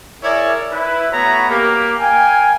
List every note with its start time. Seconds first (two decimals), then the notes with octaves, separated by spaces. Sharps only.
0.23 E4 G#4 A#4 C#5 D5
0.72 E4 B4
1.11 A3 B3 F#4 C#5 A#5 B5
1.49 A#3 G4
2.00 A#4 F5 G5 G#5